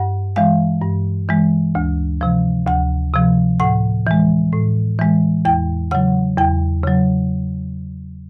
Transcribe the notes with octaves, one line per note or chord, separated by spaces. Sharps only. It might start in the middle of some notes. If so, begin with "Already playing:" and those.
Already playing: G2 F#5
E3 G#3 F5
G2
E3 G#3
D2
C3 F3
D2 F#5
C3 F3
A2 F#5
E3 G#3
A2
E3 G#3
E2 G5
C#3 F#3 F#5
E2 G5
C#3 F#3